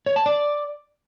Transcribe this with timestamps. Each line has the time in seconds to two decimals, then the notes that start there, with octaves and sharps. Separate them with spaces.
0.06 C#5
0.16 A5
0.26 D5